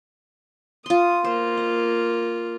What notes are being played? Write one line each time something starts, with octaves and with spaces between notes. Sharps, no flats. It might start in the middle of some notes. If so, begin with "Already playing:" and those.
F4 C6 D#6
A#3 F4 C5
D#5